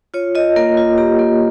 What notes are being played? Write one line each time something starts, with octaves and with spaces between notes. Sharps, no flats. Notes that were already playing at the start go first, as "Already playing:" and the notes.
F4 C#5
F4 D#5
A#3 A#4
F4
A#3 G4
A#3